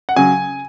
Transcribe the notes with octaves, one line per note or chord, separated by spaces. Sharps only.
F#5
C#3 F#3 G#5